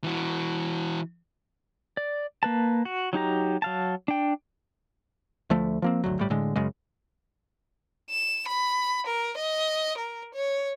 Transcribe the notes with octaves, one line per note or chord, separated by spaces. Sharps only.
E3 F#4
D5
A#3 B4 A5
F#4
F#3 D#4 G4 A#5
F#3 F5 A5
D4 G5
D2 F3 A3
F3 A#3 C4
G#1 D2 F#3
G1 A2 G3
A2 D3 G#3
F#2 C#3 G#3
E7
B5
A#4
D#5
A#4
C#5